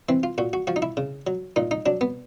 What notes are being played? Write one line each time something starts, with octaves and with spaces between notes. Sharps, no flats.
E3 C4
F4
A#2 F#4
F#4
F3 F#4
D#4
E4
C#3
F#3
A#2 D#4
D#4
F#3 D4
B3